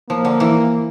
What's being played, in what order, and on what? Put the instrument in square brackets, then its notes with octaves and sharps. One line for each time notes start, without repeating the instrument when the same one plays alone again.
[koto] F3 [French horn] A#3
[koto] D3
E3